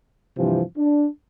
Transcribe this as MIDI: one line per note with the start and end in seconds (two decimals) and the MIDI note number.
0.37 0.62 43
0.37 0.62 48
0.37 0.62 52
0.37 0.62 53
0.37 0.62 60
0.77 1.07 62